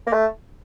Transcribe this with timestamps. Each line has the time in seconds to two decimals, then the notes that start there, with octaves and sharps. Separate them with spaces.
0.07 A#3
0.13 A3